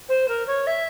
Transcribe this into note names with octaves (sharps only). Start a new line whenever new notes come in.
C5
A#4
C#5
E5